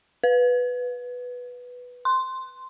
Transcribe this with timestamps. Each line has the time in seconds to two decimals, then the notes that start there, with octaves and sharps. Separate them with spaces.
0.24 B4
2.05 C6